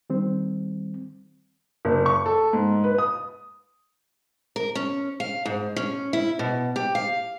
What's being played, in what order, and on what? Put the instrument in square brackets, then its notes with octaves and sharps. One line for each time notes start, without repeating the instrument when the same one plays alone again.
[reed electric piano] D#3 G3 C4
[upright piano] F#1
C#6
A4
G#2
B4
D#6
[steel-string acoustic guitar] A#4
C#4
F5
G#2
C#4
E4
B2
G4
F5